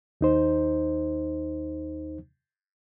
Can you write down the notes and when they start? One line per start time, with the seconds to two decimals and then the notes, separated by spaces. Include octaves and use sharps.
0.21 D#2 D#4 C5